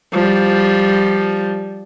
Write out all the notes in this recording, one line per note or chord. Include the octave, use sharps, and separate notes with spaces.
F3 G3